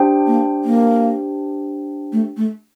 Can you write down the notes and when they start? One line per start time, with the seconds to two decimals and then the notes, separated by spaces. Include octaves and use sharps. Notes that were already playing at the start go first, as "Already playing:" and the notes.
Already playing: D4 G4 C5 G5
0.27 A#3
0.64 A#3
2.12 A3
2.37 A3